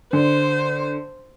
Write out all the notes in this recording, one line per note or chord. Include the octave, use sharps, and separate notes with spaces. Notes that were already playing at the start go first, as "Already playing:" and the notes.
D3 C5